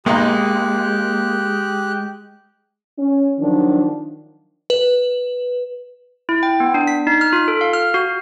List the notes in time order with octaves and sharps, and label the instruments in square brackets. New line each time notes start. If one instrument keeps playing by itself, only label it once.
[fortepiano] B1 D#4 [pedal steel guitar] G#3 [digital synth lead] A#3 [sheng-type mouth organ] G4 F#6
[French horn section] C#4
D#3 F3 F#3 D4
[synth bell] B4
[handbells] E4
G5
B3
D4
B6
D#4
F6
F4
A4
F5
F6
F#4